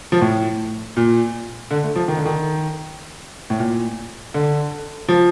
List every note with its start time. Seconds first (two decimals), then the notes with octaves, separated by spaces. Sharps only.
0.12 F3
0.21 A2
0.97 A#2
1.71 D3
1.84 A3
1.95 F3
2.08 D#3
2.17 D3
2.25 D#3
3.50 A2
3.59 A#2
4.34 D3
5.08 F3